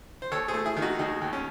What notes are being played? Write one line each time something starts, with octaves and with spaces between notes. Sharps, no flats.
C5
D#2 A4 C#5
G#4 C5
A3
E4 G#4
D#3
D#4 F#4
D#2 D#4
D#2
C#4